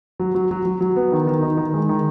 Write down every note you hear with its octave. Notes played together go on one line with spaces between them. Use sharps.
F#3
F#3
F#3
F#3
F#3
B3
D#3
D#3
D#4
D#3
G#3
D#3